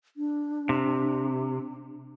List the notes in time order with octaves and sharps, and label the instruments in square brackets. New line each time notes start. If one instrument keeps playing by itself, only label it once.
[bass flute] D4
[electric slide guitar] C3